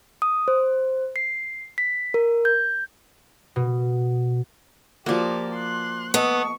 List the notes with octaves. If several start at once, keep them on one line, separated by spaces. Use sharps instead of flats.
D#6
C5
C7
B6
A#4
G6
B2
F3 A#3 F#4 G4 D5
C6 F#6
B3 A4 D#5 A5 C#6